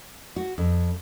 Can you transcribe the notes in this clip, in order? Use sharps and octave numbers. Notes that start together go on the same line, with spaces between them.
F#4
F2